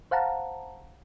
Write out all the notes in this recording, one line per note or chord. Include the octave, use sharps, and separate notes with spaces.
C5 F5 F#5 A5 A#5